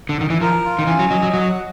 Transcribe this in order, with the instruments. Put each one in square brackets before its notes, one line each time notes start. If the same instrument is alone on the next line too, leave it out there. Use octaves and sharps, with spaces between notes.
[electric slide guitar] D3
D#3
E3
[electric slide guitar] F3 [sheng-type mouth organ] A#4
[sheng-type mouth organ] F4
[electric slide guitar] D#3
[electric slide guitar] E3 [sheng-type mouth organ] C#4
[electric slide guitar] F#3
[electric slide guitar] F#3 [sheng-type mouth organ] D#5
[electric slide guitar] F#3
[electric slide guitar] F#3 [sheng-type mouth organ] F#5